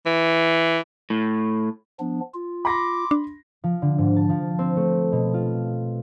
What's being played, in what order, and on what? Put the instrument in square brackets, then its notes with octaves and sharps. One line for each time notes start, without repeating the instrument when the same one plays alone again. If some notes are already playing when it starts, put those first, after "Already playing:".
[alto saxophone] E3
[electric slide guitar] A2
[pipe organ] F3 B3 D4
F4
[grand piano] B5 C6 A#6 [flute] D6
[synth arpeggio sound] D4
[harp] F3
D3
G#2
A5
F3
C4
A3
B2
F4